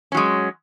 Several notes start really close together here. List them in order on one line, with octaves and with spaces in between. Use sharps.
C#4 F#3 G#3